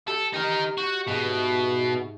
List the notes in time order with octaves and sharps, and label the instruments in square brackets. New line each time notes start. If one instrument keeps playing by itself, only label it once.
[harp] G4 [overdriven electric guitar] A4
[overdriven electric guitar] D#4 A#4 [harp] D#5 C7
[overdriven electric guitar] F#4 [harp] G6
[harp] G#2 G#3 [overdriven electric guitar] B2
[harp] E5